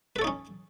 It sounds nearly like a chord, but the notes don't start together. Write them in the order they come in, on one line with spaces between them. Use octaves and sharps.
B4 A4 C#5 D#4 C#4